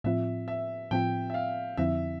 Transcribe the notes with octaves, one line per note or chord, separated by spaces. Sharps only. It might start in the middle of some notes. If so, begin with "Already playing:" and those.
A2 F3 C4 F4 E5
E5
A2 F3 C4 F4 G5
E5
F5
F2 D3 F3 C4 E4 E5